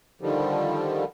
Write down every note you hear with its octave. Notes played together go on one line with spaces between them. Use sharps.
D3 D#3 F3 G3